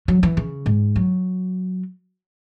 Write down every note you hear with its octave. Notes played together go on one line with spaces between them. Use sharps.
F#3
E3
C#3
G#2
F#3